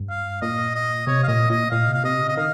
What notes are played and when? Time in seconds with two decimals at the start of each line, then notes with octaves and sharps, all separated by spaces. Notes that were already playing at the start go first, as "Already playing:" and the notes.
Already playing: G2
0.10 F5
0.42 A#2 D#5
0.75 D#5
1.07 C3 C#5
1.23 F5
1.28 A#2 D#5
1.50 A#2 D#5
1.71 A#2 F5
1.89 C3
1.94 F5
2.04 C3 D#5
2.21 C#3
2.29 D#5
2.37 D#3 F5